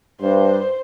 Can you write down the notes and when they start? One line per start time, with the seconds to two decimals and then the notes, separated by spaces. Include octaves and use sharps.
0.20 G2 C5